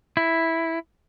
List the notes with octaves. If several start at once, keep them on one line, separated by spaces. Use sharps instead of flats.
E4